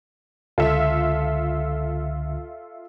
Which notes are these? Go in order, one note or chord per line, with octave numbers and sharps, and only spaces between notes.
C#2 D3 F4 A4 E5